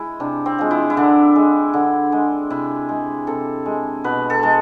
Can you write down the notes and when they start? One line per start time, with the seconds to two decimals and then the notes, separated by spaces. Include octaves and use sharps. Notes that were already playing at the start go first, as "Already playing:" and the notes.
Already playing: G#3 E4
0.20 C3 D4
0.46 C4
0.58 F3 G#3
0.71 E4
0.90 E4
0.97 D3 D4
1.36 G#3
1.74 D3
2.12 G#3
2.50 C3 E4
2.89 G#3
3.27 C3 A4
3.66 G#3
4.04 B2 B4
4.30 A4
4.43 G#3 A4